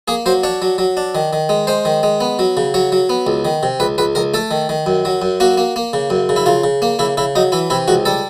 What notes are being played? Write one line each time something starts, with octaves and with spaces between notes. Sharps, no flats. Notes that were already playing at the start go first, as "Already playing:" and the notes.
A#3 G#4
F#3 C5
D4 C#5
F#3
F#3
D4
D#3
D#3
G#3
G#3 C5
D#3
G#3
B3
F#3
C#3
F#3 C#5
F#3
B3
C#2
D#3
C3
C#2 B4
C#2 B4
C#2 A#4
A3 A4
D#3
D#3
F#2
F#3
F#2
A#3 F#4
A#3
A#3
C#3
F#2
C#3
E4
C#3 F4
C#3
A#3
C#3 E4
C#3 E4
F#3 D#4
E3 E4
C3 E4
C#2 F#4
G3 A4